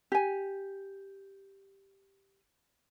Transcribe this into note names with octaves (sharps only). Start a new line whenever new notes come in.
G4 G#5